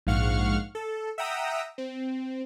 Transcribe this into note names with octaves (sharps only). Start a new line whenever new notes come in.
A#1 G#2 F5 F#5 C#6 F6
A4
E5 F#5 G5 A#5 D#6 E6
C4